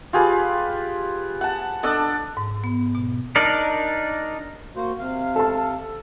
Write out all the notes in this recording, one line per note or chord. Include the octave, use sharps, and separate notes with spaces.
F4 G4 G#4 B4
F#5 A5
D4 A4 D5 D#5
G#2
B3
B2
D4 D#4 A#4 D5
A#3 F#4 C5
C3 F5
A4 A5